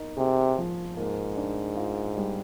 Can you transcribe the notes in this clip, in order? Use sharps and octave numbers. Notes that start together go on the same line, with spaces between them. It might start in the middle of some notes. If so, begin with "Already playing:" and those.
Already playing: A#3 D#4
C3 G#4
F3
G#2 A#3
D4
F4
G3